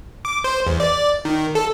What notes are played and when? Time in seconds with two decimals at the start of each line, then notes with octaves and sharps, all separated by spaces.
0.25 D6
0.44 C5
0.67 E2
0.80 D5
1.25 D#3
1.55 A4